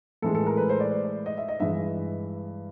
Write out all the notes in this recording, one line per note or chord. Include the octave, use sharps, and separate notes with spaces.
A2 E3 G#3 A4
A4
A#4
B4
C5
D5
D#5
E5
D#5
G2 E3 G#3 E5